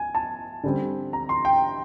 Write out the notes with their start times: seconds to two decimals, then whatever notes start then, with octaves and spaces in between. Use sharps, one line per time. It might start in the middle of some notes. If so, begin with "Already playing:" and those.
Already playing: G#5
0.15 A5
0.64 D3 G3 C4
1.13 A#5
1.29 C6
1.45 G5